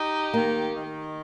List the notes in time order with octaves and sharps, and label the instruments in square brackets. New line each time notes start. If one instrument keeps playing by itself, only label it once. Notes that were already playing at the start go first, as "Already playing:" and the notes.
Already playing: [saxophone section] D#4 G4
[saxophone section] D#3 [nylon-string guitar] A#3
[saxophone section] D#3